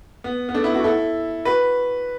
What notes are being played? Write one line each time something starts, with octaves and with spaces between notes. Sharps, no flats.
B3
B3
A3 D4
B3 E4
D4 F#4
E4 A4
F#4 B4